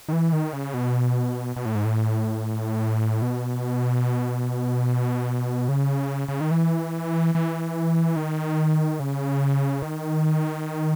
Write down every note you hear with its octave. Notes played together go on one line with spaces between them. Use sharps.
D#3
E3
D#3
C#3
B2
B2
A2
G#2
A2
B2
C#3
C#3
D#3
E3
E3
D#3
C#3
D#3